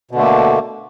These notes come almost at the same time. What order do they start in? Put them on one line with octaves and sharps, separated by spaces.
B2 D3 A3 A#3